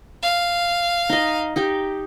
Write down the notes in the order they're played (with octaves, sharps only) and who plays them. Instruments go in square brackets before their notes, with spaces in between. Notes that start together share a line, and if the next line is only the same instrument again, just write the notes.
[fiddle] F5
[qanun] D#4 D#5
D#4 G4 G5